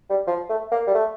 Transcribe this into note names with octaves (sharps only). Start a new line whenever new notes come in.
G3
F3
A3
A#3
G3
A3